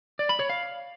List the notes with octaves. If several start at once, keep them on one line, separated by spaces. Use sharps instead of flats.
D5
B5
C#5
F5